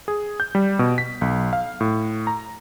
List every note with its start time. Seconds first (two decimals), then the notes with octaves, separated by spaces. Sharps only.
0.08 G#4
0.40 G6
0.55 G3
0.79 B2
0.98 B6
1.21 B1
1.53 F5
1.81 A2
2.27 A#5